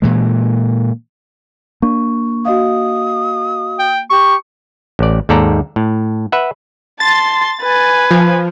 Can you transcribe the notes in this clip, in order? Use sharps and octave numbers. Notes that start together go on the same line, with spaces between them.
A#2 E3 G#3
A#3 D4 C#6
F#4 D#5 F5 D#6
G5
G4 C#6
A1 D5
D#2 G#2 A4 D5 A#5
A2
B4 E5 F#5
A5 C6 A6
B4 G#5
F3